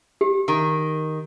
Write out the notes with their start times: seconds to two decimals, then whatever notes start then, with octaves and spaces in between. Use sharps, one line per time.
0.21 G4
0.48 D#3